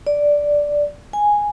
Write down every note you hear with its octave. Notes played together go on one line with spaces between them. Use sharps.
D5
G#5